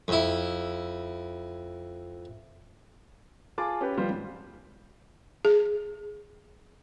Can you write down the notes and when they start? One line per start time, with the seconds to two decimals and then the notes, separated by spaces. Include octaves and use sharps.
0.08 F2 E4
3.58 F4 G#4 A5 D6 A6
3.81 C#4 G4 B4
3.98 F3 G3 B3 F4 C5
4.10 G#2
5.45 G#4